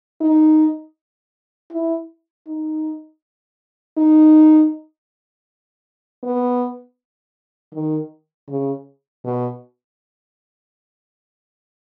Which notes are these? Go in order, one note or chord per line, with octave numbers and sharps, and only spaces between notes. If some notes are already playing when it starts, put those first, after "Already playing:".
D#4
E4
D#4
D#4
B3
D#3
C#3
B2